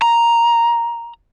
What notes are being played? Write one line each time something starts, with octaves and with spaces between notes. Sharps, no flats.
A#5